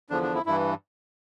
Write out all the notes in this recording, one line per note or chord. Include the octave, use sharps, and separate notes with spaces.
E2 D3 F3 D4
D4
E4
G2 E3 E4